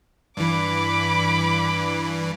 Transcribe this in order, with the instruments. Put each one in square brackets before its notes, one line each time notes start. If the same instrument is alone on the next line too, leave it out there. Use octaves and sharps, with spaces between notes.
[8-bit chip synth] G2 E3 [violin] B5 D6